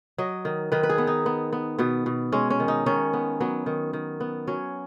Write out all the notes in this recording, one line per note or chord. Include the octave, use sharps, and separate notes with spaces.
F#3 D#5
D#3
D#3 B4
B4
G#4
B3
D#4
B3
B3
B2 B3
B2
G#3 C#4
C#4
D#3
D#4
D#3 C#4
B3
F#3 B3
D#3
D#3
B3
F#3 C#4